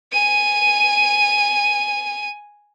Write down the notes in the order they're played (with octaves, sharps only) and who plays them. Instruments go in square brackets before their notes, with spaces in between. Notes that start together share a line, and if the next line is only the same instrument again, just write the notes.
[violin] G#5 D#7